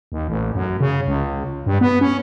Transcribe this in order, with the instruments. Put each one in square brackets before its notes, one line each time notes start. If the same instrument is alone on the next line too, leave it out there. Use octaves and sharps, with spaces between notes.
[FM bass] D#2
A1
F#2
C#3
C#2
G2
B3
C#4